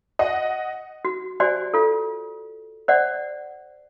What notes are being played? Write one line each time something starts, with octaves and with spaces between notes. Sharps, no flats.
D#5 F#5
F#4
F#4 G4 C5 D5 G#5
F4 A4
C5 D5 F#5